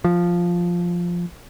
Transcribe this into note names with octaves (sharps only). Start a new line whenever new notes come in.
F3